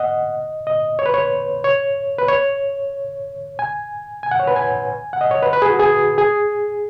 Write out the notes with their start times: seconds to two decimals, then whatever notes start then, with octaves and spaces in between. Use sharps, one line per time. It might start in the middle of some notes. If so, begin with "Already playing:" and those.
Already playing: D#5 F#5
0.67 D#5
0.99 C#5
1.06 B4
1.14 C#5
1.64 C#5
2.18 B4
2.28 C#5
3.59 G#5
4.23 G#5
4.31 F#5
4.40 C#5
4.47 B4
4.56 G#5
5.13 F#5
5.21 D#5
5.31 C#5
5.43 B4
5.53 B4
5.62 G#4
5.70 F#4
5.80 G#4
6.18 G#4